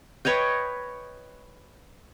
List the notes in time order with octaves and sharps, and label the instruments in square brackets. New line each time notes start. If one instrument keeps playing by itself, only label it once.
[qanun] B4 C#5 D#5 G5